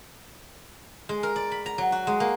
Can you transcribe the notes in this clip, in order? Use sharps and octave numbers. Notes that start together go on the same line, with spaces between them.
G#3
A#4
D5
B5
A#5
F#3
F#4
G#3
A#3